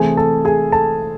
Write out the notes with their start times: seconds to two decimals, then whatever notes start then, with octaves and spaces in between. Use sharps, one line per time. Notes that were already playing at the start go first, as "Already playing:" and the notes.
Already playing: C3 E3 A3 C4 G#4 G#5
0.17 A4 A5
0.45 G#4 G#5
0.72 A4 A5